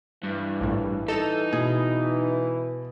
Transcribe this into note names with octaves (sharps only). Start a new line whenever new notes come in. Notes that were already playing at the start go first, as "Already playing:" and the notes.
G2 E3
A#1 A2
D#4 A4 E7
B2 G#4